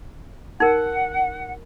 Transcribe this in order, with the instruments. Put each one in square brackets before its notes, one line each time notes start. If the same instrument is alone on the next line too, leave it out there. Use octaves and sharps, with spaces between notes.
[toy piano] D#4 A#4 [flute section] F#5